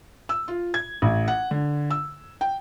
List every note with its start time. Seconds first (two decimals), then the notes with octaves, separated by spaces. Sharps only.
0.29 E6
0.48 F4
0.74 G#6
1.02 A1
1.28 F#5
1.51 D3
1.91 E6
2.41 G5